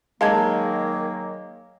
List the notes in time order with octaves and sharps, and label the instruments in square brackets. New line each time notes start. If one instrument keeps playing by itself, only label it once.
[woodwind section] D#3 F#3 A#3 [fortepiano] G#3 [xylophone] F5 A5 G#6